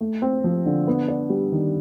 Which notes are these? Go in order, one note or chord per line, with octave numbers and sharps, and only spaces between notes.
A3
C4
F3
D3
B3
D4
G3
D#3